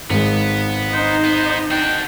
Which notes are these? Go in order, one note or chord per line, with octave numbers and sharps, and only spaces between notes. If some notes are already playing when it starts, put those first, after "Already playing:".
G#1 G#3 B3
D#4 C5
B3
D4 F#4 G5